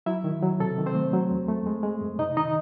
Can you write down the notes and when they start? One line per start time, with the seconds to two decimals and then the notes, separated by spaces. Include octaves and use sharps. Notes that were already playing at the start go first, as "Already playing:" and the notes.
0.06 F#3 E4 E5
0.24 D#3
0.43 F#3
0.60 C3 A4
0.78 D#3
0.86 C4 C5
0.95 A3
1.13 F#3
1.31 E2
1.48 A3
1.66 G#3
1.83 G#3
2.01 F#2
2.18 C3 D#4 D#5
2.37 D#3 D#4 D#5